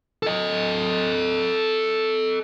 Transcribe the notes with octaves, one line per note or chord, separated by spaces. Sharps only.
A4 D#5